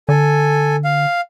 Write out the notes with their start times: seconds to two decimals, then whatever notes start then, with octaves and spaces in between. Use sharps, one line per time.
0.09 D3 A4 G#5
0.84 F5